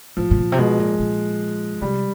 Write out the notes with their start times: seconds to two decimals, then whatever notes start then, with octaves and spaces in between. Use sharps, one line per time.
0.17 A2 F3
0.31 A2
0.38 A#2
0.52 C3
0.58 B2 G#3
0.79 A#2
1.00 A#2
1.81 C3 G3